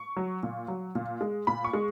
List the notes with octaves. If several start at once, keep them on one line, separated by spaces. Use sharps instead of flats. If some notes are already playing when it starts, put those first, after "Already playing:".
Already playing: C#6
F#3
A#2
F#3
A#2
G#3
A#2 B5
C#6
G#3